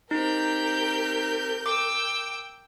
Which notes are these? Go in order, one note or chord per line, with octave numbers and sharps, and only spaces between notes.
C4 D#4 G4 A#4 G6
G5 D6 E6